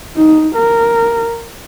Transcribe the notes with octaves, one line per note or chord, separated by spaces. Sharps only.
D#4
A#4